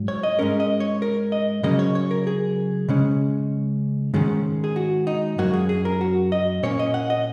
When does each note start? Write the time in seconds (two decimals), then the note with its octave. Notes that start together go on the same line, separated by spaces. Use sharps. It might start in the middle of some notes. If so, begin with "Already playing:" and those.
Already playing: G#2 F#3
0.08 C#5
0.23 D#5
0.39 G#2 G#3 C#4 A#4
0.60 D#5
0.80 C#5
1.02 A#4
1.32 D#5
1.63 C#3 F#3 A#3 C#4 D#5
1.79 C#5
1.95 C#5
2.11 A#4
2.27 G#4
2.89 C#3 G#3 C#4
4.14 G#2 D#3 G#3 C#4
4.64 G#4
4.76 F#4
5.07 D#4
5.38 F#2 F#3 A#3 F#4
5.54 G#4
5.69 G#4
5.85 A#4
6.01 F#4
6.32 D#5
6.63 A#2 A#3 C#4 C#5
6.79 D#5
6.94 F#5
7.10 D#5